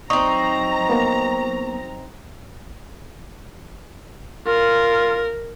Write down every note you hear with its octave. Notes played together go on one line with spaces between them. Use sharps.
F#3 C4 D#4 A#5 C#6 D#6
A#3 B3
F4 A#4